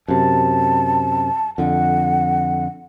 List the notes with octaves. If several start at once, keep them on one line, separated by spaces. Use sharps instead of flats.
F#2 C3 A5
F2 D3 F#5